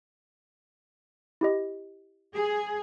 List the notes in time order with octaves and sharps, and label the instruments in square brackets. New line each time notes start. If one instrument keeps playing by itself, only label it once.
[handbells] E4 G4 D#5
[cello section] G#4